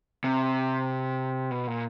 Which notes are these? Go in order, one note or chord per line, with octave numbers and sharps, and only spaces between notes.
C3
B2
A#2